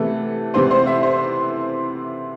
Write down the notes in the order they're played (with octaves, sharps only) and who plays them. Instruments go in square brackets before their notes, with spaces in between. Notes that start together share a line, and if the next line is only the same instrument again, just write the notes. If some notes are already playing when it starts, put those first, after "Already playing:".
Already playing: [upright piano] C3 E3 A3 B3 A4
C3 E3 B3 C4 C5
C4 C5
E4 E5
C5